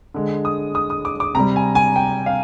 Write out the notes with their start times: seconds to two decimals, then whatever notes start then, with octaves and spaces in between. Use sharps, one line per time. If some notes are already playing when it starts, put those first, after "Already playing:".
0.14 D3 G#3
0.45 D#6
0.75 D#6
0.90 D#6
1.05 D6
1.20 D6
1.35 C3 G3 A#5
1.56 G#5
1.75 G#5
1.96 G5
2.26 F5